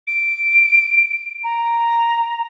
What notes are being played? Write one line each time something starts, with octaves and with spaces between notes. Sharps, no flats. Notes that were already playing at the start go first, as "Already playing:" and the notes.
D7
A#5